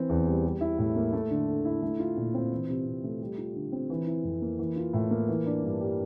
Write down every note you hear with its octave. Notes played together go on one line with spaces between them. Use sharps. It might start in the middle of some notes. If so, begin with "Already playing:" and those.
Already playing: E3 C4
E2
G3
G3
E4
A2
A#3
A3
D3
D3
E4
A3
F4
A#2
C4
E3
C3
C3
A3
G3
F4
D3
C4
E3
E4
F2
A#3
E3
F4
A2
A#3
E3
D4
G2
G3